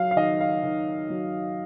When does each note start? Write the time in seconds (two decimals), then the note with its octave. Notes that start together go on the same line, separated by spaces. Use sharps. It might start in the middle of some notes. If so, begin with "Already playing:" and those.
Already playing: F#3 F5
0.11 F5
0.16 D#3 D#5
0.41 F5
0.64 D#3
1.10 F#3